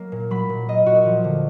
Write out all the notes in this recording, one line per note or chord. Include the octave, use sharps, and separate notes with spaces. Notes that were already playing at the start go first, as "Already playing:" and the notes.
Already playing: F#3 A#3
A#2
F#3 B5
A#2
A#3 D#5
A#2 F#4
F3
D3